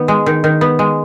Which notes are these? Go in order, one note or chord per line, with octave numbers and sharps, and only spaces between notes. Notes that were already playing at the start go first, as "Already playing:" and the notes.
Already playing: D#3 B3
G#3
D#3
D#3
B3
G#3